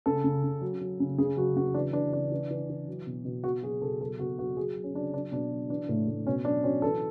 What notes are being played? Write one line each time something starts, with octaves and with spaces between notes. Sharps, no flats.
C#3 A4
C#3
C#3
F#3
F#3
C#3
C#3 G#4
F#3 F#4
C#3 F#4
E3 D4
E3 D4
E3 D4
E3
E3
E3
F#3
B2
B2
B2 F#4
F#3 G#4
B2 A4
F#3 A4
B2 F#4
F#3 F#4
F#3 G#4
F#3
C#4
F#3 D4
F#3 D4
B2 D4
F#3
E3 D4
A2
A2
B2 C#4
F#3 D4
F#3 C#4
E3 A4